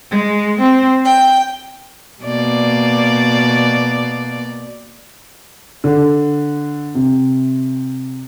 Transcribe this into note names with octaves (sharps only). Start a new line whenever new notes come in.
G#3
C4
G5
B2 A#3 D5
D3
C3